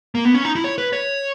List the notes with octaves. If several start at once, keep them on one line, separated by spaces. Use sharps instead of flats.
A#3
B3
C#4
D#4
E4
C#5
B4
C#5